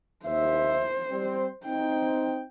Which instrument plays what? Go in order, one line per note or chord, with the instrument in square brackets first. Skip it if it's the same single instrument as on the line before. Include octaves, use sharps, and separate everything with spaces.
[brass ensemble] D#2 E5 [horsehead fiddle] C5
[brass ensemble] G3 C4
[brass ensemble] C4 D#4 [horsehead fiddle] G5